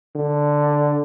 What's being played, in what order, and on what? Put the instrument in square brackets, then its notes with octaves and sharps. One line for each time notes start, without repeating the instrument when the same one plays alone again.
[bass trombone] D3